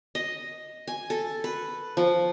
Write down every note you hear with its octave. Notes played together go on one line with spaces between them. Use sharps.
D#5
G#5
A4
B4
F3